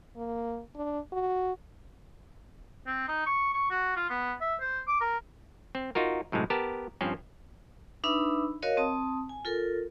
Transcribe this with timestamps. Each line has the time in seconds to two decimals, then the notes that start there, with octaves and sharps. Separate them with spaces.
0.16 A#3
0.76 D4
1.12 F#4
2.86 C4
3.08 D#4
3.26 C#6
3.54 C#6
3.71 F#4
3.96 F4
4.10 B3
4.41 E5
4.60 C5
4.88 D6
5.01 A#4
5.75 C4
5.95 D#4 F4 F#4 A#4
6.32 F#2 A2 C3 G#3
6.50 B3 G4 A#4 A5
7.01 G2 F3 C4 C#4
8.04 D4 D#4 B4 E5 B5 E6
8.62 F#4 A#4 C#5 D#5 F5
8.77 C4 A5 D#6
9.29 G#5
9.45 F4 A4 A#4